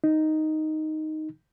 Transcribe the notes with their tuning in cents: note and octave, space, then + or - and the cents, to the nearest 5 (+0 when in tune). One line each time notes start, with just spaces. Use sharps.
D#4 +0